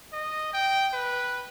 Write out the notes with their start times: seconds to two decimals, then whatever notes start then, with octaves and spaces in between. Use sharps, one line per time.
0.13 D#5
0.53 G5
0.93 B4